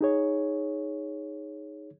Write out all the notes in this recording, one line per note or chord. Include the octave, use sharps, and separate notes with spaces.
D#4 G#4 C#5